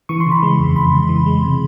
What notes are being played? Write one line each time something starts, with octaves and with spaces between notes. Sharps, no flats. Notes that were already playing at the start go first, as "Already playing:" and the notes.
E3 C#6
C6
C#3
B5
G#3
F2
F2 B5
C#3
E3
G#3
C3